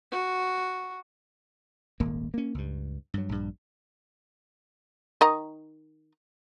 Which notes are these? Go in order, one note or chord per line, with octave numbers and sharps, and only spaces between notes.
F#4
D#1 G#1 A#3
A#3 C#4
C#2 G2
G2 F#3
A#1 G2
D#3 D#5 A#5